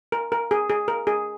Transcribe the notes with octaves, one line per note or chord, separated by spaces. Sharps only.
A#4
A#4
G#4
G#4
A#4
G#4